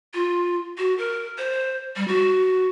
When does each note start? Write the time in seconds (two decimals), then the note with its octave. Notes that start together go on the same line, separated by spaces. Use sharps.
0.14 F4
0.78 F#4
0.98 A#4
1.38 C5
1.96 G3
2.08 F#4